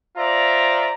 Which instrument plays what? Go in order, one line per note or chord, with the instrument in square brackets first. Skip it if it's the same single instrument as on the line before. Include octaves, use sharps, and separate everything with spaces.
[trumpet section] F4 C5 D5 E5 A#5